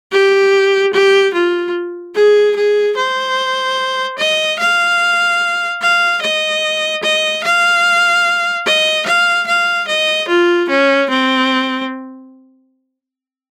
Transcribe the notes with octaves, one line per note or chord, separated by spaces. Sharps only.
G4
G4
F4
G#4
G#4
C5
D#5
F5
F5
D#5
D#5
F5
D#5
F5
F5
D#5
F4
C#4
C4